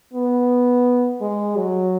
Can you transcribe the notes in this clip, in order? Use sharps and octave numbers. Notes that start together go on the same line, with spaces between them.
B3
G#3
F#3